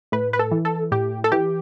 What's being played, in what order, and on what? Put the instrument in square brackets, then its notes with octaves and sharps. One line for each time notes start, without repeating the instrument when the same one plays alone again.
[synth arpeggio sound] A2 B4
B4
A4
E3
A4
A2 G4
A4
E3 G4